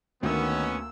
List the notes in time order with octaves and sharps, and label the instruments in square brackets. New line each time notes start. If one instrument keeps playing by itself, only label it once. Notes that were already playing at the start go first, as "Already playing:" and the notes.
[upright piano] D2 [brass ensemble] D#3 [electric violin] A#3 E6 [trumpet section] B3 C#4